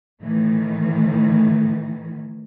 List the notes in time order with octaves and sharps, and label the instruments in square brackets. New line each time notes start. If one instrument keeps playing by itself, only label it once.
[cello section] A2 D#3 E3